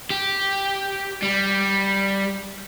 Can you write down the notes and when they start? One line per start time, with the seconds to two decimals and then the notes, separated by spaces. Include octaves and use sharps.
0.11 G4
1.23 G3